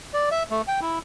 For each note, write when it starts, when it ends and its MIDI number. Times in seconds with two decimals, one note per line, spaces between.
0.14 0.29 74
0.31 0.43 76
0.51 0.62 57
0.68 0.80 79
0.81 0.99 64